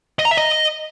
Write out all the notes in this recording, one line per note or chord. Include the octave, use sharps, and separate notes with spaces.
D#5
A#5
E5
D#5